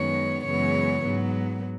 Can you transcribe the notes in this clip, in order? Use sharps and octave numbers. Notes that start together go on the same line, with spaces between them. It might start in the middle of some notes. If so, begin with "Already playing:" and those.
Already playing: F#2 D#3 G#3 B3 C#5
F#2 C#3 E3 G#3 B3 C#5
G#2 F#3 B3